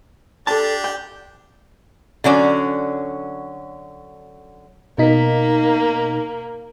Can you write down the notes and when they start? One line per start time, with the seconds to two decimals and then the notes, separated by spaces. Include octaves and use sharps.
0.47 D4 G4 A4 A5
0.84 G5
2.24 D3 F#3 C#4 D5
4.98 B2 A#3 D#4 B6